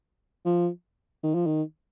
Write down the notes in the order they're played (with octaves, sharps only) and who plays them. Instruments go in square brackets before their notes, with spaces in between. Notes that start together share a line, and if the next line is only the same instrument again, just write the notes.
[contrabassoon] F3
D#3
F3
D#3